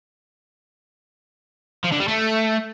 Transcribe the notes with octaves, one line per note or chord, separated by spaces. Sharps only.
F3
D3
G3
A3